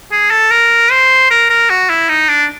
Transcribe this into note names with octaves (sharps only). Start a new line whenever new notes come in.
G#4
A4
A#4
C5
A#4
A#4
F#4
E4
D#4
D4